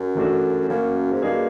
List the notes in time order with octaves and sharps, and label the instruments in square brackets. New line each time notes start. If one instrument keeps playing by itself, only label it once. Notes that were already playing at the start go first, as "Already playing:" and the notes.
Already playing: [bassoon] F#2
[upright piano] E3 A3 D4 F#4
[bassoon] F#2 [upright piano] F#3 A#3 C#4
[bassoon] G#2
[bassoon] G2 [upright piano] F#3 A#3 D#4 G#4